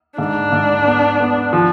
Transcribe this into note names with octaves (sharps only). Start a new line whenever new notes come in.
G#2 D4
G#2
B3
B3
F3